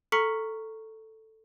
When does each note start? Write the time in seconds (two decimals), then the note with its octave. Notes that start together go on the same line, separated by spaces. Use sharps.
0.12 A4 A#5 C#6 F6 B6 C#7